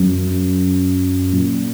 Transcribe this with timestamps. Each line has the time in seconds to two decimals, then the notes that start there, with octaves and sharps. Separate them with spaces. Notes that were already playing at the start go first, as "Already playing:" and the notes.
Already playing: F#2
1.33 A#2